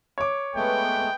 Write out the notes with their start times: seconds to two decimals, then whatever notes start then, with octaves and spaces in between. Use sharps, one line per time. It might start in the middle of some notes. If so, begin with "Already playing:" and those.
0.18 C#5 D6
0.55 G#3 A3 B3 G5